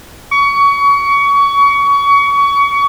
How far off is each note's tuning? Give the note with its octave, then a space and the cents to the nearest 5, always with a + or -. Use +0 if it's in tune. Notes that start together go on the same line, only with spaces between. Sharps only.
C#6 +25